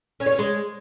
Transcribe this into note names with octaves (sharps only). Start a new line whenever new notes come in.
C#4
C#5
C#4
G#3